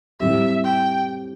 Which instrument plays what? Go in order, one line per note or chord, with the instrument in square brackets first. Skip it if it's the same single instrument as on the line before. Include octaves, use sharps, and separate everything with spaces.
[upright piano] A2 G3 C4 G4 [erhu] E5
[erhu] G5